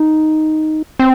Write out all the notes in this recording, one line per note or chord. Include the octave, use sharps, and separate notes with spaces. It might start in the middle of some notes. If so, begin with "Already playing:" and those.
Already playing: D#4
C4